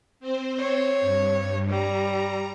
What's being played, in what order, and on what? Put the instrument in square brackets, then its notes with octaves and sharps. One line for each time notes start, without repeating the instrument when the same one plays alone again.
[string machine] C4 C5
[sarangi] C#5
[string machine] G2
[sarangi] G3 [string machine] A#5